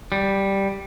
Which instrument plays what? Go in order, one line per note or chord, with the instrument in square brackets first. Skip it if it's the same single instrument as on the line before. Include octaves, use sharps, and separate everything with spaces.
[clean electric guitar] G3